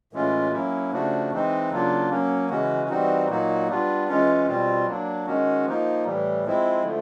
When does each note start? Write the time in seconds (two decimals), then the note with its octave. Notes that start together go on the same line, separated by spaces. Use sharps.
0.13 A2 E3 G#3 C#4 F4
0.52 F#3 A#3 C#4 E4
0.92 C#3 F3 A3 D4 F#4
1.31 E3 G#3 C4 D#4
1.71 C#3 F#3 A#3 D4 F4
2.10 F#3 A#3 C#4
2.49 C#3 E3 G#3 C#4 F#4
2.89 E3 G3 C4 D#4 F#4
3.29 A#2 F#3 A#3 D#4 F#4
3.68 G3 B3 D4 F4
4.08 E3 G#3 C#4 F4
4.47 B2 G3 C4 F4
4.87 F#3 A#3 D4
5.26 D#3 G#3 C#4 F#4
5.66 F3 A#3 D#4
6.05 A2 E3 G3
6.45 F3 G#3 C4 E4
6.84 D3 F3 A3